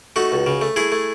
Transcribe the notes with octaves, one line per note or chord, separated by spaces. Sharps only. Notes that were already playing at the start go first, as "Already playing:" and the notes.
A3 D#4 F#4
C#2
C#3
A3
A3 E4 G#4
A3